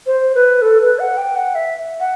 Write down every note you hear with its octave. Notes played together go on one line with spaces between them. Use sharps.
C5
B4
A4
B4
F#5
G5
F#5
E5
F#5